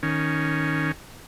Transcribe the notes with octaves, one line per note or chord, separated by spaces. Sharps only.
D#3 C#4